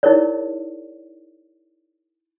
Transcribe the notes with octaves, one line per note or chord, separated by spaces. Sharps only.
D#4 E4 G#4 A#4 C#5 D5